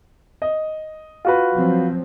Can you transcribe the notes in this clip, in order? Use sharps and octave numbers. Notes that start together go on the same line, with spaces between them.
D#5
F4 F#4 B4
F3 F#3 C4